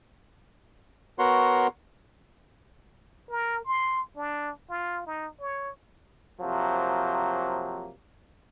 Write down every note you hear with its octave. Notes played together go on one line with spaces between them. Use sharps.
B3 F#4 A#4 C#5 F#5 C6
A#4
C6
D4
F4
D#4
C#5
C3 F3 F#3 A#3